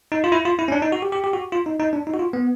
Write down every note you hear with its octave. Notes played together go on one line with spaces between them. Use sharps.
D#4
F4
E4
F4
E4
C#4
D4
D#4
F#4
G4
G4
G4
F#4
F4
D#4
D#4
D4
D#4
F#4
F4
B3